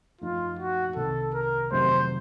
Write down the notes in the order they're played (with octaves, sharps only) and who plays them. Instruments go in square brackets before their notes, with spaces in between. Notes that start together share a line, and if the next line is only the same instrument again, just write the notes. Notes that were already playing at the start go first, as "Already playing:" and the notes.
[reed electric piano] F#2 F3 A3 D#4 [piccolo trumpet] F4
[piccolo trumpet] F#4
[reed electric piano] C2 C3 D#3 [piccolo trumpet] A4
[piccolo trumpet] A#4
[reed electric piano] F2 C3 D#3 F#3 A3 [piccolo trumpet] C5